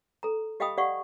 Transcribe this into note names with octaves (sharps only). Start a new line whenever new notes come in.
A4 A#5
G4 D#5 F5 G5 B5 D#6
G4 D5 F5 F#5 C#6